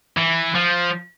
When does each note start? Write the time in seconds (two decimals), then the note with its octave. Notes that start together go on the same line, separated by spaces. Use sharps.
0.17 E3
0.55 F3